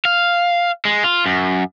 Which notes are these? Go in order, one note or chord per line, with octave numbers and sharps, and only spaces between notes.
F5
G#3
F4
F#2